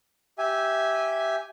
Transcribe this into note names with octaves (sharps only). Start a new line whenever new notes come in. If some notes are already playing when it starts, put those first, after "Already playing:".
G4 E5 G#5